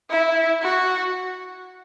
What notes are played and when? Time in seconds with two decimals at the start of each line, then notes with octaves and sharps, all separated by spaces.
0.10 E4
0.62 F#4